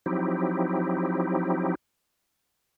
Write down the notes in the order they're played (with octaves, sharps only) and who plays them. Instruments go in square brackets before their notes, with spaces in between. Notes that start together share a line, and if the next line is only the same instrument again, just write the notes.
[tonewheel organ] F3 F#3 C4 D#4 E4 G4